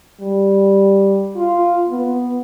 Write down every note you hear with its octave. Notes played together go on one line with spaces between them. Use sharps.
G3
F4
B3